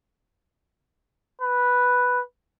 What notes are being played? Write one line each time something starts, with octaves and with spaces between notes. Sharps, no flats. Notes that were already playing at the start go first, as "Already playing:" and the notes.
B4